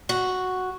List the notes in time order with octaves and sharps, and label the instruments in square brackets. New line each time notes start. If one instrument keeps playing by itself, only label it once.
[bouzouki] F#4